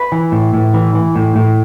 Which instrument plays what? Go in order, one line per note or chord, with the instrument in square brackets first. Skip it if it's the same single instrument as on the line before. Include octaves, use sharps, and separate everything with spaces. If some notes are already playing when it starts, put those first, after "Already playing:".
Already playing: [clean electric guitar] B4
E3
A2
A2
E3
E3
A2
A2